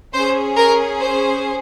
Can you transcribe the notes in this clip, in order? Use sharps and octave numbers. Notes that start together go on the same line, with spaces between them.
C#4 G#4 C5
A#4
C5